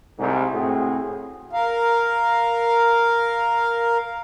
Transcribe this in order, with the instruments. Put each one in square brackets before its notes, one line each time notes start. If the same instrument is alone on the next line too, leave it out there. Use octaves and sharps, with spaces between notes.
[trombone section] C2 G#2
A2 C4 F#4 G#4
[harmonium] A#4 F5